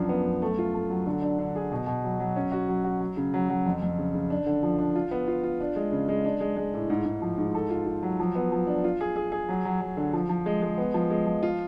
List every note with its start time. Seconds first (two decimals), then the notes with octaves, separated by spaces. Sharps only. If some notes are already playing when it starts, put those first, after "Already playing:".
Already playing: F#2 F3 D4
0.09 B3
0.25 F#2
0.42 A3
0.58 F4
0.74 A3
0.90 F#3
1.06 D3
1.22 D4
1.39 D3
1.56 G#4
1.72 B2
1.87 B2
2.04 F#3
2.20 F#3
2.36 C#4
2.52 F#4
2.68 F#3
2.84 F#4
3.00 F#3
3.17 C#3
3.34 F#3
3.49 F#3
3.66 F2
3.82 F2
3.98 C#3
4.14 C#3
4.30 D4
4.46 D3
4.63 F3
4.79 D4
4.96 F4
5.11 B3
5.28 F4
5.43 F4
5.60 D4
5.76 G#3
5.92 C#3
6.08 G#3
6.25 D4
6.40 G#3
6.57 G#3
6.74 A2
6.90 G#2
7.05 G#2
7.22 F3
7.38 G#2
7.55 A4
7.70 F4
7.86 F4
8.03 F#3
8.20 F3
8.35 B3
8.52 F3
8.67 D4
8.84 F4
9.01 G#4
9.16 G#4
9.32 G#4
9.49 F#3
9.65 F#3
9.81 F#3
9.97 D3
10.13 F3
10.29 F3
10.46 G#3
10.62 G#3
10.78 B3
10.94 F3
11.10 G#3
11.27 F3
11.43 F4